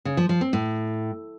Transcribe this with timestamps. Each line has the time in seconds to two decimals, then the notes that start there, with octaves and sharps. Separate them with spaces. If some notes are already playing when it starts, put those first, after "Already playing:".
0.05 C#3
0.17 F3
0.29 F3
0.41 C4
0.53 A2